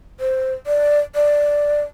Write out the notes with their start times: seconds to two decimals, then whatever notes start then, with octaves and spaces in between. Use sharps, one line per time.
0.20 C5
0.67 D5
1.15 D5